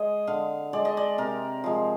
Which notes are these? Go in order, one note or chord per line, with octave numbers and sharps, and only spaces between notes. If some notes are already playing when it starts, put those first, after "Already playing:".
Already playing: G#3 D#5
D3 F5
G#3 D5
D#5
D5
C3 A#4
F3 G#3